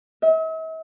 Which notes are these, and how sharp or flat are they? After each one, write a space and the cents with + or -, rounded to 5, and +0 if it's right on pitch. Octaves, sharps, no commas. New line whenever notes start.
E5 -45